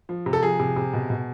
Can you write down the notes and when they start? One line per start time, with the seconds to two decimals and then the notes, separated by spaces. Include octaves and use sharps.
0.09 F3
0.26 C3
0.33 A4
0.43 F3 G#4
0.60 C3
0.76 C3
0.93 B2
1.10 B2